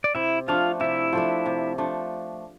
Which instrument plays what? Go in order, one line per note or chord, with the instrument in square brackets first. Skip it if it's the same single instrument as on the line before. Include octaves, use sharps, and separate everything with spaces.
[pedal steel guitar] D5
[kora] C3 [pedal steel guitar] E4 E5
[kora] F3 A3 D4 [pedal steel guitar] F4 F5
[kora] C3 [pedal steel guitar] E4 E5
[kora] F3 A3 D4
C3
F3 A3 D4